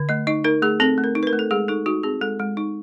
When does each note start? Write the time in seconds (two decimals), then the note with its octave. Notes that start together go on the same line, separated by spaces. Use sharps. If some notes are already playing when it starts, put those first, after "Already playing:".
Already playing: D3
0.09 A3 D#5
0.27 D#4 D#5
0.44 D#4 A#4
0.62 A3 G#4
0.80 C4 A4
0.98 A3
1.04 A#4
1.15 D#4
1.23 B4
1.27 A#4
1.33 A3
1.39 A4
1.51 G#3 G#4
1.68 D#4 A4
1.86 D#4 F#4
2.03 C4 G#4
2.21 G#3 A4
2.39 G#3
2.57 D#4